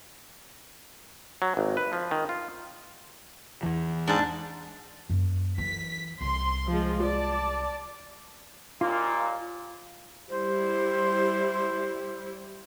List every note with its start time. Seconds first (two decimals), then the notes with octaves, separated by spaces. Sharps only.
1.42 F#3
1.57 G#1
1.77 B4
1.93 F3
2.11 D#3
2.29 F4
3.63 E2 E3
4.08 G#2 D4 A5
5.10 F#2 A#3
5.58 E3 F#3 B6
6.21 C2 C6
6.67 F3 G#3
7.04 D5 A5
8.81 D#2 A#2 A#3 F4
10.30 G3 E4 C5